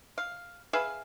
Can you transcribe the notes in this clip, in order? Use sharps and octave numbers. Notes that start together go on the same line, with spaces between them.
F5
G#4 B4 E5 F5